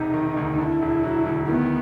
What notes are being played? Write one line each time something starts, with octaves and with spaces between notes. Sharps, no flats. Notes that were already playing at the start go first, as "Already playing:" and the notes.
Already playing: E1 C3 D#4
D#3
D2
D3 E4
E1
F#3
D2
D#3 B3